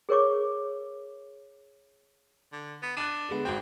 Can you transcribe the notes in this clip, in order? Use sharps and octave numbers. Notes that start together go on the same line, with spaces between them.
G#4 A#4 C#5 C#6 D6
D3
B3
D4 F#6 A6 D#7
D3 G#3 B3
G#1 C4 F#4 G5